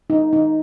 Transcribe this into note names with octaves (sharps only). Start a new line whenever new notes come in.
D#4
D#4